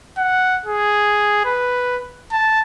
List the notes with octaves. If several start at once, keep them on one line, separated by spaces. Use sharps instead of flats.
F#5
G#4
B4
A5